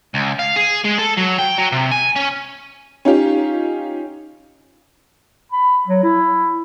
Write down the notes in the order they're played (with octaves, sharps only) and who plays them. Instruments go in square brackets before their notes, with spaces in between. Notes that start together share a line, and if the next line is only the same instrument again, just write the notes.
[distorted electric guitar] C#2
F5
G#4
G#3
A4
F#3
G5
F#3
C3
G#5
C#4
[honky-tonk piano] C#4 D#4 F4 G4
[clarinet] B5
F#3
E4